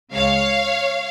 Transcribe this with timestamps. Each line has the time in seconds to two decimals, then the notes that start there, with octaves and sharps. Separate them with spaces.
0.12 C#2 C#3 G#3 C#5 F5